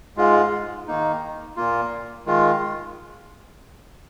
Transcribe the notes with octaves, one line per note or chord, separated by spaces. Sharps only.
G#2 G#3 F4
D#3 A#3 D#4
A#2 A#3 F4
D#3 G#3 F4